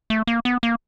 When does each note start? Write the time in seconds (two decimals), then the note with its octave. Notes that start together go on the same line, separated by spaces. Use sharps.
0.10 A3
0.27 A#3
0.45 B3
0.63 A#3